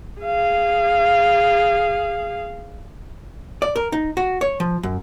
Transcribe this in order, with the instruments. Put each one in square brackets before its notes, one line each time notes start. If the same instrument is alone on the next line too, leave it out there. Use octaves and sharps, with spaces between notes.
[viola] G#4 F5
[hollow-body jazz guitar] D5
A#4
D#4
F#4
C#5
F3
F#2